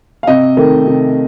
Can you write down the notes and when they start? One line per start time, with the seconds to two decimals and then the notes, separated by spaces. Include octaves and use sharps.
0.23 F5
0.27 C3 D#5
0.57 D#3 A3
0.87 C3